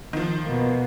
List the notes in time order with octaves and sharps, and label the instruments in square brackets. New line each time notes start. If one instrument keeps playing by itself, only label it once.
[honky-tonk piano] D#3 F3
[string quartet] B2 A#3